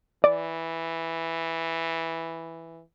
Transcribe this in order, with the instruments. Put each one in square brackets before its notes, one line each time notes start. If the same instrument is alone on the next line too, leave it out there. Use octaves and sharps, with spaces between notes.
[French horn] E3 [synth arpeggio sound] D5